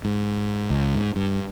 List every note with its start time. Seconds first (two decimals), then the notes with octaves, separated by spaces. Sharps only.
0.05 G#2
0.70 C#2
0.95 G#2
1.16 G2